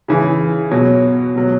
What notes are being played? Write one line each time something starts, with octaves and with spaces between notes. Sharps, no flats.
C#3 E3
B2 F#3
B2 F#3